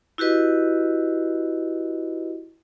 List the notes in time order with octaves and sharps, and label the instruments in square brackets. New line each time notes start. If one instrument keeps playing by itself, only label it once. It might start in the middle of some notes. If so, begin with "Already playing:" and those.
[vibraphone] E4 F#4 G4 B4 D#5